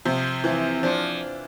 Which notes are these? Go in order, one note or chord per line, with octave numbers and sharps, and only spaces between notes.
C3 F3
E3 F3
F3 D4